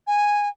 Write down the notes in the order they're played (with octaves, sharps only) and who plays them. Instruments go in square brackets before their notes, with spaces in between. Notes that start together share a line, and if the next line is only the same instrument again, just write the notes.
[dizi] G#5